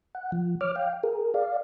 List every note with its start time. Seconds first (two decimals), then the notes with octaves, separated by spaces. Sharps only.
0.15 F#5
0.32 F3
0.61 C#5 D6 F6
0.76 F5 G5
1.03 G#4 A#4
1.34 D5 F5